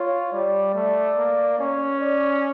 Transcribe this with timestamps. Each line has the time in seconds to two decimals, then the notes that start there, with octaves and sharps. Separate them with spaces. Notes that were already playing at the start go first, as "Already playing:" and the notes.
Already playing: F4 C#5
0.33 G3 D5
0.74 A3 D5
1.17 A#3
1.59 C#4 C#5
2.01 D5